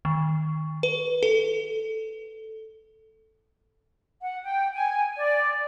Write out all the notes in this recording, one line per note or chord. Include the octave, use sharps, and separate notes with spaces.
D#3
B4
A4
F#5
G5
G#5
D5